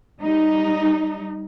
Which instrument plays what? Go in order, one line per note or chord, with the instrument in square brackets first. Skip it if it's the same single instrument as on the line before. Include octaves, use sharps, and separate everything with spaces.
[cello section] G3 D#4